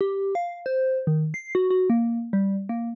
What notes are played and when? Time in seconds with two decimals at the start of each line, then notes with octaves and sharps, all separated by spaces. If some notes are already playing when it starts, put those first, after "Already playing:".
0.01 G4
0.35 F5
0.66 C5
1.07 D#3
1.34 C7
1.55 F#4
1.70 F#4
1.90 A#3
2.33 G3
2.69 A#3